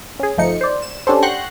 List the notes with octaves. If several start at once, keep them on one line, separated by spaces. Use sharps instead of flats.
C#4 G#4
G1 F3 A3 D#4 C#7
C5 D5
E7
C#4 D4 G4 A4 C5
F#5 G5 C6 C#6 F#6 A#6